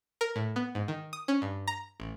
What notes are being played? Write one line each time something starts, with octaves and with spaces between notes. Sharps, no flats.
A#4
A2
B3
G#2
D#3
D#6
C#4
G2
A#5
A1